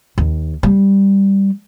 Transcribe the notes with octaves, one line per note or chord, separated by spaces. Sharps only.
D#2
G3